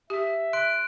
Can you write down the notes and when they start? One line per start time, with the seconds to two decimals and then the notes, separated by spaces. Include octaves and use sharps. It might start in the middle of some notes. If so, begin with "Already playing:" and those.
0.10 G4 E5
0.53 C6 F#6 D7